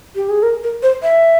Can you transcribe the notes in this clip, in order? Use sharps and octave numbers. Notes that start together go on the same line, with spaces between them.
G4
G#4
A#4
A#4
C5
E5